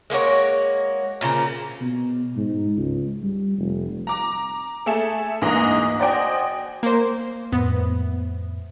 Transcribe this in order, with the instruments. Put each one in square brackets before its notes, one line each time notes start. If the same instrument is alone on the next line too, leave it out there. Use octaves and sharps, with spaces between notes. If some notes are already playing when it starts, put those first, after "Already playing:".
[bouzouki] G#3 A#3 F#4 C#5
A#2 C#3 C4 A#5
[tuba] B2
G#2
C#2
G3
F1
[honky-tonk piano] A#5 D6
A3 G#4 A4 E5 E7
D2 G#2 E3 A#3 D#5 A#5
F#4 C5 D5 D#5 G5 G#5
[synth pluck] A#3 C5
[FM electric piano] F2 A2 [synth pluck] B3